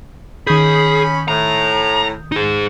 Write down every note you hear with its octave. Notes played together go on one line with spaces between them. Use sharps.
D#3 C#4 G#4 B5 D#6 G6
A2 A#5
D#4 G#4